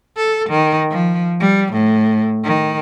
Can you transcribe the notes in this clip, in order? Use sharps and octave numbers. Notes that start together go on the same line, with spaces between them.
A4
D#3
F3
G3
A2
D#3